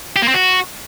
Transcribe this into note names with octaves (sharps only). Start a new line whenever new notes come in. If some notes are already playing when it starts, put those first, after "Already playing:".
G4
A#3
C4
F#4